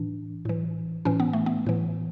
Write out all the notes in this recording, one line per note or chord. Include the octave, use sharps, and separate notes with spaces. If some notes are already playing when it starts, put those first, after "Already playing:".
Already playing: A2 E3 D4
A2 E3
A2 E3 C#4
B3
A3
B3
A2 E3